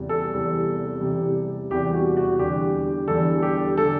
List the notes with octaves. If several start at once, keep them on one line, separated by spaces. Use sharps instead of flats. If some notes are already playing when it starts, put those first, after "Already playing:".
Already playing: E2 C3 G3
A4
E2 C3 G3
E2 C3 G3
E2 C3 G3 G4
F#4
F#4
E2 D3 G3 G4
E2 D3 G3 A4
G4
D3 G3 A4